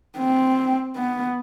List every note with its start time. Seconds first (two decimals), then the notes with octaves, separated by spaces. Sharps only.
0.18 C4
0.97 B3